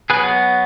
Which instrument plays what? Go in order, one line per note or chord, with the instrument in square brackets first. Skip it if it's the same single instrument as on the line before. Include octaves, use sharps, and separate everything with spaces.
[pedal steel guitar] F#3 B3 G#4 B4